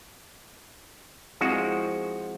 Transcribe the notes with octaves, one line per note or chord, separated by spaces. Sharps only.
F3 G#3 C4 E4 F#4